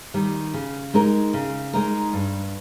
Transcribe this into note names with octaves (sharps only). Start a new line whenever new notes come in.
D#3 G3
C#3
G#3 D#4 A#4
C#3
G#3 D#4 A#4
G2